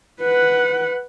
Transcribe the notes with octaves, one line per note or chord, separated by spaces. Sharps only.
B4 F#5